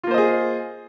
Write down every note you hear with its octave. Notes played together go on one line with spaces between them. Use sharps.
A#3 F4 G#4 C5 D#5